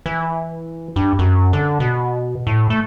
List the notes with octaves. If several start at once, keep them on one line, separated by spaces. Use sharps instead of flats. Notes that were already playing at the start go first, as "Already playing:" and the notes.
E3
G2
F#2
D3
B2
A2
A3